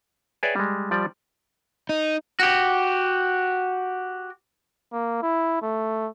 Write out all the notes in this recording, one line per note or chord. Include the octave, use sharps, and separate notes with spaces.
G#4 B4 C#5 D5 E5 G5
G3 G#3
F3 G3 D5
D#4
F#4 G4
A#3
E4
A3